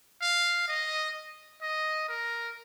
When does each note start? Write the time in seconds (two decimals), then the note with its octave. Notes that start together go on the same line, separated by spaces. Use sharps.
0.21 F5
0.68 D#5
1.62 D#5
2.09 A#4